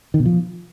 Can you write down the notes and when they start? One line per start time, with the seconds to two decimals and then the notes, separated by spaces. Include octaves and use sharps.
0.14 D#3
0.20 B2
0.26 F3